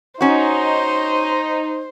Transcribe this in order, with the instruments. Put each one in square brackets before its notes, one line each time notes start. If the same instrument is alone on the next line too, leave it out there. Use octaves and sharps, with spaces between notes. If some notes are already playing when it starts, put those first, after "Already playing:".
[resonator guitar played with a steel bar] C#4 F#4 [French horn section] D#4 [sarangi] C5